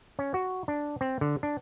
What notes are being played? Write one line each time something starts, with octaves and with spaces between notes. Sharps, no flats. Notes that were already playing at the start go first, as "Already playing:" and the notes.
C#4
F#4
D4
C4
D3
D4